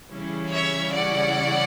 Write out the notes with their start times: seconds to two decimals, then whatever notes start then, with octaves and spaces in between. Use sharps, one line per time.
0.12 C#3 E3 G3 C#4 E4
0.51 C#5 E5
0.91 D5 F#5